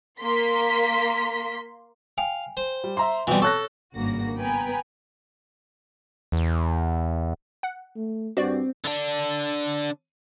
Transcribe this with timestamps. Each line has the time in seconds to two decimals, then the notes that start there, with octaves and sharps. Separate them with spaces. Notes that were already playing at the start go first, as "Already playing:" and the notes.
0.22 A#3 C6 B6
2.18 F5 G5 G#5
2.57 C5
2.84 G3
2.97 E5 A#5 C6
3.27 B2 E3 G3 C4
3.42 A4 C#5 A5 C#6 F#6 A#6
3.95 G#1 G2 C#3 A#3 F#4 A#6
4.39 B3 B4 G5 G#5 A#5
6.32 E2
7.63 F#5
7.96 A3
8.37 G2 C4 F#4 D5
8.84 D3 D4